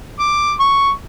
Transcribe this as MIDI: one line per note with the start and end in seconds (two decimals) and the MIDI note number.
0.19 0.53 86
0.60 0.91 85